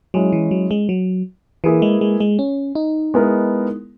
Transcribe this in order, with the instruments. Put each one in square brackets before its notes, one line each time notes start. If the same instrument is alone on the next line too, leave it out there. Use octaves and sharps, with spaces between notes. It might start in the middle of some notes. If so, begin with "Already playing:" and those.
[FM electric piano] F#3 [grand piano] G#3 C#4 E4
[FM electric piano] E3
F#3
G#3
F#3
[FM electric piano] E3 [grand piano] A#3 E4 G#4 B4
[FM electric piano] G#3
G#3
G#3
C#4
D#4
[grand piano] G#3 B3 E4 A#4